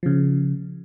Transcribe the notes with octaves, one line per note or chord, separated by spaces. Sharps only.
C#3 F3